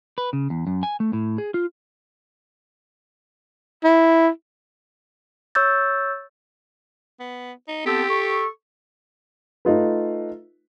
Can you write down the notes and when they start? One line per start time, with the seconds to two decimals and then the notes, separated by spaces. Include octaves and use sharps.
0.18 B4
0.33 C#3
0.50 E2
0.67 F#2
0.83 G#5
1.00 A3
1.13 A2
1.38 G#4
1.54 F4
3.84 E4
5.55 C#5 C#6 E6 G6 A6
7.20 B3
7.68 D#4
7.86 B3 C4 G4 A4
8.10 A4 C#6
9.65 A3 D#4 F4 B4